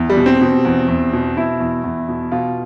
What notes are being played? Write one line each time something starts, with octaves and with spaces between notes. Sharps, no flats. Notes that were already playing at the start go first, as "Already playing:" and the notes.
Already playing: E2
G3
B2
C4
B2
E2
E2
B2
B2 E4
E2
E2
B2
B2 F4